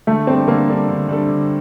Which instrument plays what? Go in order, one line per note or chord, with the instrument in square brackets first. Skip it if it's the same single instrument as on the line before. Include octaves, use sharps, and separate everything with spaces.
[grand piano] D3 [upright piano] A3
[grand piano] G3 D4 A4 [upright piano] C4
[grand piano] D3 [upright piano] A#3
[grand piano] G3 D4 A4
D3
G3 D4 A4
D3